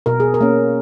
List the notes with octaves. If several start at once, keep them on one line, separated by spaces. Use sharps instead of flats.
B2 A#4
G#4
A#4
A#3 C#4